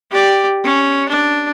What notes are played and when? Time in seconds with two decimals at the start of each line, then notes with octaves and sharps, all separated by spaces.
0.11 G4 D5
0.64 C#4
1.09 D4